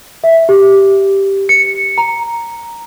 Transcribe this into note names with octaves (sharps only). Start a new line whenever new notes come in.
E5
G4
C#7
A#5